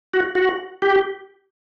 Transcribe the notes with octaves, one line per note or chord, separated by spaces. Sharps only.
F#4
F#4
G4